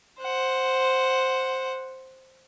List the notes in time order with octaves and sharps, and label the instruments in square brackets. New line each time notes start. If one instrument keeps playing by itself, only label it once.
[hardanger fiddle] C5 F#5